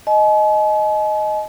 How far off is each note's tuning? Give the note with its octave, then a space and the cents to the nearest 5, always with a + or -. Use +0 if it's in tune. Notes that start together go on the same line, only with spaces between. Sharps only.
D#5 +0 G#5 +45